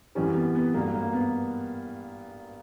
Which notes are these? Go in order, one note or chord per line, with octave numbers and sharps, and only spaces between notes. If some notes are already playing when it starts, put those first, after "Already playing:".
F#2 E3 G3 C#4
B3
B3
G2 F#3 A#3
A#3
B3